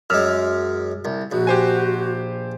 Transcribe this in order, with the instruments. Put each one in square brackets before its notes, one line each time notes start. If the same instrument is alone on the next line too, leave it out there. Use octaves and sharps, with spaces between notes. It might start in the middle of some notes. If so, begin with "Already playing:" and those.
[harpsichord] F#2 G#3 [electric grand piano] E6 F6
[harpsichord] C2
[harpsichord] A#1 [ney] F#4
[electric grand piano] G4 C5 G#5